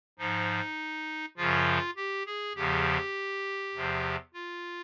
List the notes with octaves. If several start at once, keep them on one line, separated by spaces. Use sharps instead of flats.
G#2 F3 D#4
F#2 C#3 F3 F4
G4
G#4
E2 C#3 F3 G4
E2 C3 F3
F4